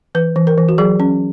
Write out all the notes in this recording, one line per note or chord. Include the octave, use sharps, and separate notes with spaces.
E3 B4
E3
A#4
E3
F#4
F#3 G#4
C#4